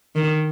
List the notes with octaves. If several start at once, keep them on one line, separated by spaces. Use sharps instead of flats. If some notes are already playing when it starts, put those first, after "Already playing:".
D#3